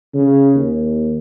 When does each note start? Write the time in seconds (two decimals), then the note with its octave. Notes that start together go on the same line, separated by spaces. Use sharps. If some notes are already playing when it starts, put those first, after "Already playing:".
0.14 C#3
0.55 D#2